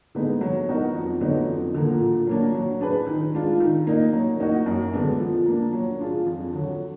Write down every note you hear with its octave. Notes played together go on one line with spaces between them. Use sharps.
D3 G#3 B3 D#4
F#3
B3 D#4 F#4 A#4
F2
D3 F#3 B3 D#4
F2
D3 F3 A#3
A#2
F#3 A#3 D4
F#3
D4 G#4 B4
D#3
G#3 D4 F4
D#3
A#3 D#4
F#3
A#3 D#4 F#4
F#2
D3 G#3 B3 D4
F3
A#3
D4
F#3
D4 F4 G#4
F2
D3 F#3